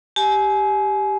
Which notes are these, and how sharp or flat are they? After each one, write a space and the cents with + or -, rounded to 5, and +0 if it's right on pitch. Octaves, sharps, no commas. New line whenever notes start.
G4 +0 G#5 +30